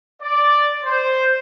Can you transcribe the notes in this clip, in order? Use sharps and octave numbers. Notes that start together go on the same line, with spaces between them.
D5
C5